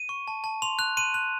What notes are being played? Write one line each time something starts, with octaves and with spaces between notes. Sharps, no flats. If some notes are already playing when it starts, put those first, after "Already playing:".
Already playing: D#7
C#6
A5
A5
C6 F7
F#6 F7
C6 D#7
F#6